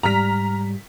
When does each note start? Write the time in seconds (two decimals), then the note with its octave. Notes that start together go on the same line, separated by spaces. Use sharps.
0.03 G#2 G3 A#5 F6 B6